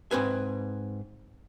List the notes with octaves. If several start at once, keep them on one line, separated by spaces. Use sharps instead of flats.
G#2 C4 B4 G#5